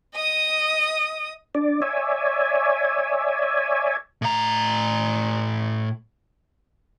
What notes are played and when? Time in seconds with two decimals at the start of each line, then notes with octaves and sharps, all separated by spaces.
0.14 D#5 D#6
1.55 D4 D5
1.82 C#5 D5 E5 G#5
4.22 A2 A#5